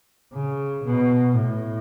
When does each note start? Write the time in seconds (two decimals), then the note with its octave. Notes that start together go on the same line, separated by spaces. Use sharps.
0.33 C#3
0.84 B2
1.37 A2